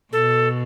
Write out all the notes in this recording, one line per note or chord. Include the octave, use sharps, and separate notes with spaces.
B2 A4